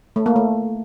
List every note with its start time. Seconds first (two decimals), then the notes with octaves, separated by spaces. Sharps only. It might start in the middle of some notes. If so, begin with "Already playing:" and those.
0.16 A3
0.26 A#3
0.36 A3